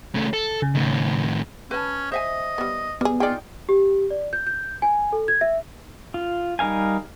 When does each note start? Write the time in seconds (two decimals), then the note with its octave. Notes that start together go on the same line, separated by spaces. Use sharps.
0.15 C#3 A3
0.33 A4
0.62 C#3
0.75 A2 D#3
1.71 C#4 B4 A5
2.12 C5 D#5 E5 G#5
2.58 G3 B3
3.01 G3 B3 G#4
3.20 D#4 F4 G#4 D5 G5
3.69 G4
4.11 D5
4.33 G6
4.47 G6
4.82 G#5
5.13 A4
5.28 G#6
5.41 E5
6.14 F4
6.59 G3 D#4 A#4 F5 G#5